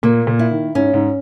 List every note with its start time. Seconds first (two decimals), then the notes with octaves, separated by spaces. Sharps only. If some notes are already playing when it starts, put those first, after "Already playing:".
0.03 A#2 A#3
0.27 A#2
0.39 E4
0.51 D#3
0.75 G#2 C#4
0.94 G#2